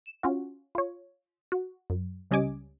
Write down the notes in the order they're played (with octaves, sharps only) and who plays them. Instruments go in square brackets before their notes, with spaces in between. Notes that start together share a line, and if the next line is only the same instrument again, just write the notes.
[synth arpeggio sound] E7
C#4 F4 F#4
F4 C#5
F#4
F#2
C#2 G3 C#4 D#5 G#5 D6